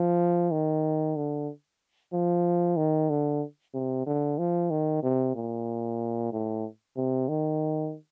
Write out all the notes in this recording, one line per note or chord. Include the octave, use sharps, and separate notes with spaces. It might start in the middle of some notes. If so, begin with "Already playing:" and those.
Already playing: F3
D#3
D3
F3
D#3
D3
C3
D3
F3
D#3
C3
A#2
A2
C3
D#3